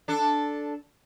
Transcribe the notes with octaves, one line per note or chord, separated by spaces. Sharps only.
D4 A4